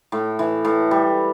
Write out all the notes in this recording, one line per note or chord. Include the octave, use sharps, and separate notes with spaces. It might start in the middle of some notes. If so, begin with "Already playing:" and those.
A2
E3
A2
G3